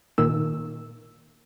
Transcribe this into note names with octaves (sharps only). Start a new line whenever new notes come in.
A#2 D#3 E6